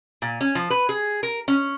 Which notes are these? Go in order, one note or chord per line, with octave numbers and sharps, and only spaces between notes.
A#2
C#4
F3
B4
G#4
A#4
C#4